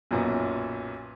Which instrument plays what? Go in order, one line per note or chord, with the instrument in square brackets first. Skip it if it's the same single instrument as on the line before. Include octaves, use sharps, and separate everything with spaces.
[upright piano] B1 F#2 A#2 B3